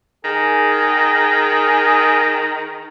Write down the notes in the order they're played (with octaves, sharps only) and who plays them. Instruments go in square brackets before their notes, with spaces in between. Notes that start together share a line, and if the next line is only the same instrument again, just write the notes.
[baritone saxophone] D#3 [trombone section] G#4